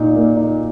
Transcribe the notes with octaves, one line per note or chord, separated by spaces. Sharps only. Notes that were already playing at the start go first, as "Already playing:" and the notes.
Already playing: A#2 D#4
A#3
D#4